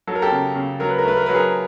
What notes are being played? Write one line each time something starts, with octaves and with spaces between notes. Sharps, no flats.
F#3 A4
A#4
G4 A4
C#3
C#3
F#3 A#4
B4
A#4
A3 B4
A#4
F#3 B4
G#4 A#4